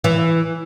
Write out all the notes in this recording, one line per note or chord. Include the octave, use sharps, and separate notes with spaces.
E3